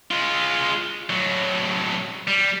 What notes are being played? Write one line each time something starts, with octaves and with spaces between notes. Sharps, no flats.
G#3 F4
A2 F#3
G3